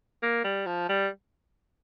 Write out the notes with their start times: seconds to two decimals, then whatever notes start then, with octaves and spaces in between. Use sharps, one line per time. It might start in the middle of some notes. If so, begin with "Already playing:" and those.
0.23 A#3
0.44 G3
0.66 F3
0.89 G3